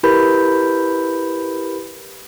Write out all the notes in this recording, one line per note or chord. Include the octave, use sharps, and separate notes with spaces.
E4 G4 A#4 B4 B5 G6